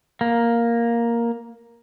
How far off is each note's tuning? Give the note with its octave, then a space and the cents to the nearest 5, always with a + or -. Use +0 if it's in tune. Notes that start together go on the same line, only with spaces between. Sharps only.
A#3 +5